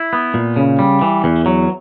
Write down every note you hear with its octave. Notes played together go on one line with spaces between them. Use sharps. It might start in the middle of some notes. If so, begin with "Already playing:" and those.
Already playing: E4
B3
A#2
C#3
G3
E3
E2
F#3